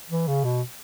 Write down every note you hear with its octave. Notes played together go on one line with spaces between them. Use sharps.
E3
C#3
B2